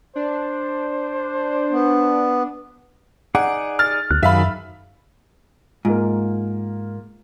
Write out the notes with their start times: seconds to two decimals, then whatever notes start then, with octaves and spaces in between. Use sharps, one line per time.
0.16 D4 C5
1.71 B3
3.35 D#4 G#4 D5 F#5
3.79 F6 A6
4.11 D2 F#6
4.23 F#2 D#3 F#3 G#4 E5 F5 B5
5.85 G#2 A#3 F4